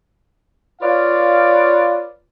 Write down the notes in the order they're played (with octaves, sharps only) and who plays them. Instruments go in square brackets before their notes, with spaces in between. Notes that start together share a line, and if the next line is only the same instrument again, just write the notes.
[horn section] F4 B4 C#5 D5 F5